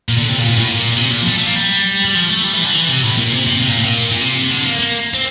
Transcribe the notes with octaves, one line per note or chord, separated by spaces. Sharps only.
A#2
D3
C3
A#2
A#2
A2
A#2
C3
A#2
F3
G3
A3
A#3
G3
G3
F3
A3
G3
E3
D3
E3
C3
A2
A#2
C3
C3
C3
A#2
A2
A#2
A#2
C3
D3
A#3
A#3
C4